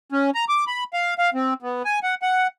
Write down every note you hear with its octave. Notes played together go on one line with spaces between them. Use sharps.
C#4
A#5
D6
B5
F5
F5
C4
B3
G#5
F#5
F#5